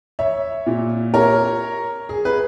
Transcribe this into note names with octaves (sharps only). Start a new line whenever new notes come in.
C#5 E5
A#2
A#4 C#5
G#4
G#4 B4